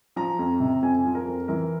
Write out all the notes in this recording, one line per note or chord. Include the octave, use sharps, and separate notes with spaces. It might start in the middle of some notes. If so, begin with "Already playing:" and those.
F3 A#5
F2
C3
F2 G#5
F3
A#4
F2
E3 A#4